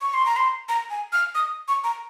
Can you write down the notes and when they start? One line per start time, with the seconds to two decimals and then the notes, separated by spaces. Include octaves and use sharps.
0.02 C#6
0.14 C6
0.26 A#5
0.36 C6
0.69 A#5
0.90 G#5
1.13 F6
1.35 D#6
1.68 C#6
1.84 A#5